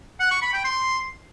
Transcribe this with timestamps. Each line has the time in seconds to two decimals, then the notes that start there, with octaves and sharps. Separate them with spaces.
0.20 F#5
0.31 C#6
0.42 B5
0.53 G5
0.65 C6